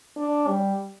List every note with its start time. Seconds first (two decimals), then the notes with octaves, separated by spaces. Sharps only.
0.17 D4
0.48 G3